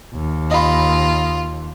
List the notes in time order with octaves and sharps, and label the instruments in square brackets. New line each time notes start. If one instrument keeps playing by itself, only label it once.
[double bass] D#2
[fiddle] F4 [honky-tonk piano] D#5 B5